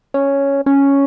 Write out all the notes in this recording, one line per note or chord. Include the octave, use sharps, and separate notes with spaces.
C#4
C#4